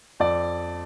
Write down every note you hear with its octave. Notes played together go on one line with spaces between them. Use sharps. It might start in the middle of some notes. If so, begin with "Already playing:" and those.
F2 D5